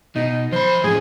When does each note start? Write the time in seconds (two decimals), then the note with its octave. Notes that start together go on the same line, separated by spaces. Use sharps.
0.16 B2 D#4
0.53 F3 C5 B5
0.84 A2 F3 G#4